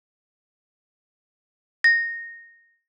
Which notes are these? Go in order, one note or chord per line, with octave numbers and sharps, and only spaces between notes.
A#6